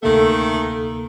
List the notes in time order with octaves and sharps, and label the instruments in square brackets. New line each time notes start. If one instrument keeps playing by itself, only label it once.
[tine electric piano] D2 C3 A#3 [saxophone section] D#3 A3 [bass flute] A4